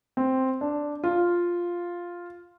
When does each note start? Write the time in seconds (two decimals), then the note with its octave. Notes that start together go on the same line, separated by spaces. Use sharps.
0.17 C4
0.61 D4
1.04 F4